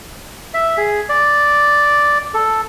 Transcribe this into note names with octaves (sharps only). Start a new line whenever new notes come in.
E5
G#4
D5
A4